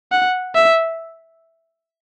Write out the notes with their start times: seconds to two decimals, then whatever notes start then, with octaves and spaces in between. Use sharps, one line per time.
0.12 F#5
0.55 E5